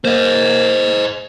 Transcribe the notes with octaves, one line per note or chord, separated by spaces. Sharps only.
A#3 C5 D#5